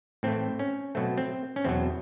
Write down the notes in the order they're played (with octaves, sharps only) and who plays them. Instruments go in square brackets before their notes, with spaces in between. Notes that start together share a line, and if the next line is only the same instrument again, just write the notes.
[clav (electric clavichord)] A2 E3 A3 C4
C#4
B2 F#3 A3 C4
C4
C#4
E2 B2 F#3 C4